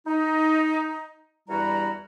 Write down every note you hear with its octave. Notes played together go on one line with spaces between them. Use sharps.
D#4
E2 G2 G3 E4 F#4 A#5